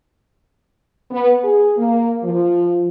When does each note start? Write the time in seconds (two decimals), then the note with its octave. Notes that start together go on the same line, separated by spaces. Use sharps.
1.11 B3
1.43 G#4
1.77 A#3
2.24 F3